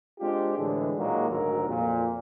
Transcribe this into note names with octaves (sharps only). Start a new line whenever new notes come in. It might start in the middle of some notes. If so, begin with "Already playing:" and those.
G#3 C4 D4 F4 G4
A2 D3 E3 G#3
A#2 D#3 F#3 G#3 A#3
G#1 D2 G#2 F#3 A#4
F2 A#2